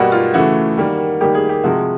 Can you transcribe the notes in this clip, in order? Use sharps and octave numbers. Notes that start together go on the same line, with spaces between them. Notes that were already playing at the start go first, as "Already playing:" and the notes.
Already playing: B2 G3 A#3 F#4
F4
C#3 E3 A3 F#4
D#3 G3 A#3
D#3 G3 A#3 G4
G#4
G4
C3 F3 G#3 F#4